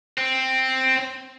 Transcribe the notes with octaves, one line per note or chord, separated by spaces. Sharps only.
C4